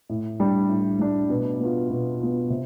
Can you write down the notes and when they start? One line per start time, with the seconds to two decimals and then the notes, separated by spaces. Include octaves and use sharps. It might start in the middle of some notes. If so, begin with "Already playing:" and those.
0.09 A2
0.40 G3 D4
0.70 A2
0.99 G3 D4
1.29 B2
1.60 B3 F4
1.90 B2
2.20 B3 F4
2.50 C3